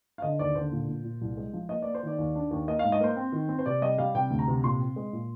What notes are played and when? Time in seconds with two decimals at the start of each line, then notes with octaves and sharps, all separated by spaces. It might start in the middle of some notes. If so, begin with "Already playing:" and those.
0.18 F5
0.22 D3 D#5
0.39 D#2 D5
0.55 D3 C5
0.72 A#2
0.89 A#2
1.04 A#2
1.21 C2
1.37 G#3
1.53 F3
1.69 A#3 D#5
1.82 A#3 D5
1.94 C5
2.03 D#3 D5
2.18 D#2
2.35 D4
2.51 D#2
2.68 A#3 D#5
2.79 G#2 F5
2.92 D#5
3.00 A#3 C5
3.17 C4
3.32 D#3
3.49 C4
3.59 C5
3.66 C3 D5
3.82 G3 D#5
3.98 G3 F5
4.15 C3 G5
4.30 D2
4.39 A#5
4.48 C3
4.64 A#2 C6
4.80 C4
4.96 G#3
5.13 A#2